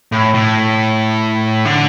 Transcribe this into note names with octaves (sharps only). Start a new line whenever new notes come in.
A2
A2
D3